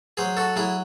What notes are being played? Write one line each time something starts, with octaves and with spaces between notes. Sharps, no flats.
F#3 G#4 C5
F#4 A4
F#3 E4 G#4